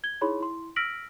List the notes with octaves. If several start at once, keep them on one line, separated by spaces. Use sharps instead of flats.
G#6 G7
D#4 E4 G#4 C#5 B5 C6
E4 C6
E6 F6 A#6 B6 D7 F#7